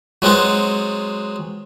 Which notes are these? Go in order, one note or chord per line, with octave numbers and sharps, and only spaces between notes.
F#3 G#3 B3 C4 F#4